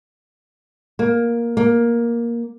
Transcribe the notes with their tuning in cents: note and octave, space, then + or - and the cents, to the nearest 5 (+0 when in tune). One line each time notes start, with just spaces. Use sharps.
A#3 +10
A#3 +10